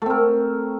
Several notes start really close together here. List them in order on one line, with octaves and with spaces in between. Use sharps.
A3 C4 A#4